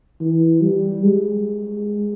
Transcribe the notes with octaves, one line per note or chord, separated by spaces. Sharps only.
E3
G3
G#3